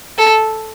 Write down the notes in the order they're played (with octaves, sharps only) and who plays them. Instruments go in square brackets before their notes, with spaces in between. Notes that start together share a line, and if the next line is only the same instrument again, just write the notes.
[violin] A4